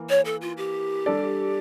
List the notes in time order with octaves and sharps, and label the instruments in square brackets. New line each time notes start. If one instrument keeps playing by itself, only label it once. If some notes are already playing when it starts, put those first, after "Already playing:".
Already playing: [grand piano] E3 A#3
[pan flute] C#5
A4
F4
G4
[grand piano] G3 D4 A4 D5